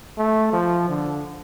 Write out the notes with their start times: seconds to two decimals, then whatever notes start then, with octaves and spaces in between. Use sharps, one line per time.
0.18 A3
0.53 F3
0.89 D3